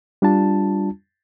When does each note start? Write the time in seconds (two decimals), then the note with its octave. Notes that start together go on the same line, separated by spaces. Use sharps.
0.22 G3 D4 F4 A5